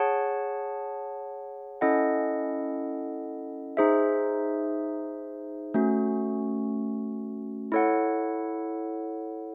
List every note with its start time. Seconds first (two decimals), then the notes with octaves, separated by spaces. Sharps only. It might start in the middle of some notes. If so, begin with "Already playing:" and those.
Already playing: G#4 C#5 F#5 A5
1.81 C#4 E4 A4 D#5 F#5
3.77 D#4 G#4 C5 E5
5.74 A3 C#4 F#4
7.72 E4 A4 C#5 F#5